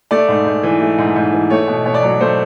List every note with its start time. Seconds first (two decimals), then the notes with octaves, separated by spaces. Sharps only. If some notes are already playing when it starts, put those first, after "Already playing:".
0.11 A3 D5
0.28 G#2
0.45 G#2
0.63 E3
0.81 A3
0.98 G#2
1.16 G#2
1.33 E3
1.50 A3 C#5
1.68 B2
1.85 B2 C#5
1.94 D5
2.03 F#3 C#5
2.20 A3 C5